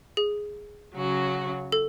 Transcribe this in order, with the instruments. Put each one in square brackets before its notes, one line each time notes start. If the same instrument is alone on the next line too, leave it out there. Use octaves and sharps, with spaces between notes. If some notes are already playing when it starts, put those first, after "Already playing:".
[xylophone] G#4
[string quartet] C#3 F#3 C#4 F#4
[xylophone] A4